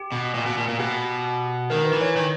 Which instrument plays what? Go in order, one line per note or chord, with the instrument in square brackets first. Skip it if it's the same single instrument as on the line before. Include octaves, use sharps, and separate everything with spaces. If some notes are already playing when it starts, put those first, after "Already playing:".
Already playing: [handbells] G4
[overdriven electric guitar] B2
A#2
B2
A#2
A#2
[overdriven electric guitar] B2 [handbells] G4
[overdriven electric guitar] D#3 [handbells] A#4
[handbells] B4
[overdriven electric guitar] E3
[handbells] C#5
[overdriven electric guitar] D#3